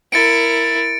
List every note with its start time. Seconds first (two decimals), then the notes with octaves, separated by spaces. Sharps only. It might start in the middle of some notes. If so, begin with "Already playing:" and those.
0.12 E4 A#4 A6 C#7 D7